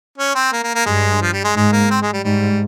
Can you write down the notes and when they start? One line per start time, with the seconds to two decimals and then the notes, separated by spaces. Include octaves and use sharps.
0.18 C#4
0.35 C4
0.53 A#3
0.64 A#3
0.75 A#3
0.86 G2 G#3
1.22 F3
1.33 G3
1.44 G#3
1.55 G#2 G#3
1.72 A#3
1.91 C4
2.02 G#3
2.13 G3
2.24 G#2 G3